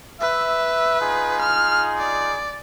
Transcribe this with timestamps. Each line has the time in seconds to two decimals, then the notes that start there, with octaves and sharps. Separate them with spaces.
0.21 B4 E5
1.00 D#4 F4 G#4
1.42 F6
1.98 D5